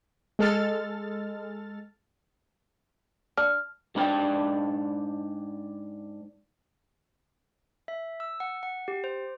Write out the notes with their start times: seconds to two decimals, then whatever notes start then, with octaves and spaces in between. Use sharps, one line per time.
0.39 G#3 A4 F6 A6
3.38 D4 F6
3.95 G#2 D4 D#4 A#4 D5 G5
7.88 E5
8.20 E6
8.40 F#5
8.63 F#5
8.88 G4
9.04 C5